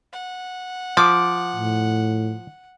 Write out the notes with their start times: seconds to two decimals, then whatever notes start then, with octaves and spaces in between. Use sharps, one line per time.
0.13 F#5
0.97 F3 D6
1.56 A2